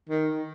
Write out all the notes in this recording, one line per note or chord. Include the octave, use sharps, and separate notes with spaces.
D#3